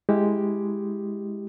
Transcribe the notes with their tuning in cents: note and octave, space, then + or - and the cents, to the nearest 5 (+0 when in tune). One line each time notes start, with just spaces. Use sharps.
G#3 +0 E4 -15 G4 +0